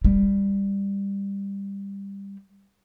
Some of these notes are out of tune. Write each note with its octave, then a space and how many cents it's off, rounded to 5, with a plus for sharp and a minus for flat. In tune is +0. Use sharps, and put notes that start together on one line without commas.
G3 +15